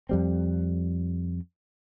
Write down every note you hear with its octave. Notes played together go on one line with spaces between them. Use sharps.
F2 G3 C4